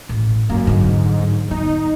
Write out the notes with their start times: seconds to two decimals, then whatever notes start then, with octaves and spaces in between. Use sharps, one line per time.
0.09 A1
0.50 F#2 A#3
0.67 G#2 D3 F#3
1.51 B3 D#4